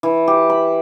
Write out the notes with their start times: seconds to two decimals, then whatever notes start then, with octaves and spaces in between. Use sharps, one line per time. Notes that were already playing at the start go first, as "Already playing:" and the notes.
0.03 E3
0.28 G4
0.50 B5